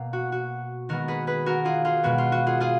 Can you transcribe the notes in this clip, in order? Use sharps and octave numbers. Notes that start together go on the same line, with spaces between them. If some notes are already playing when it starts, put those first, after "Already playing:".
Already playing: B2 A#3
F#4
F#4
D#3 G#3 B3 F#4 A#4
G#4 B4
G#4 B4
F#4 A#4
F4 G#4
F4 G#4
B2 G#3 B3 F#4
F4
F#4
F4 G#4
F4 G#4